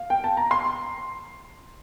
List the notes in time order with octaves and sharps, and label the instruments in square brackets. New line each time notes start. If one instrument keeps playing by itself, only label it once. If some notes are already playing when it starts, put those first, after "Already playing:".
Already playing: [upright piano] F5
G5
A5
A#5
C6